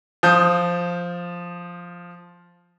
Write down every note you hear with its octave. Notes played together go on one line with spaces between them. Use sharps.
F3 D#6 G6